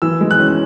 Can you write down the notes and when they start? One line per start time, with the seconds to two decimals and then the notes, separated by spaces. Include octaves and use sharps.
0.02 E3 E6
0.21 G#3
0.31 F#6
0.40 C#4